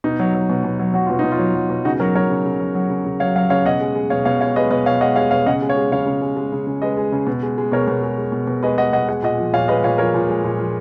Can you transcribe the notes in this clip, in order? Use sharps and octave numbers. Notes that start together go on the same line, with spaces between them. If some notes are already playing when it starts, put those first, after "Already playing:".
B2 D#4
F#3
F#3
B2
B2
F#3
F#3 F#4
B2 F4
B2 D#4
F4
F#3
F#3
B2
C#3 D#4 F#4
F#3 F#4 A#4
F#3 A#4 C#5
C#3
C#3
F#3
F#3
C#3
C#3
F#3 C#5 F5
F#3 C#5 F5
C#3 C#5 F5
B2 D#5 F#5
G#3
G#3
B2 C#5 F5
B2 C#5 F5
G#3 C#5 F5
G#3 B4 D#5
B2 B4 D#5
B2 C#5 F5
G#3 D#5 F#5
G#3 C#5 F5
B2 C#5 F5
C#3 D#5 F#5
G#3
C#5 F5
G#3
C#3 C#5 F5
C#3
G#3
G#3
C#3
C#3
G#3 B4 D#5
G#3
C#3
B2
G#3
G#3
B2 A#4 C#5
B2
G#3
G#3
B2
B2
G#3 B4 D#5
G#3 D#5 F#5
B2 D#5 F#5
G#3 F#5
A#2 D#5 F#5
F3
A#2 C#5 F5
G#3 B4 D#5
A#2 C#5 F5
F3 A#4 C#5
A#2
G#3
A#2
F3